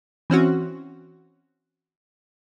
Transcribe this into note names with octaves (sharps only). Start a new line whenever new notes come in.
E3 C4 C#4 F#4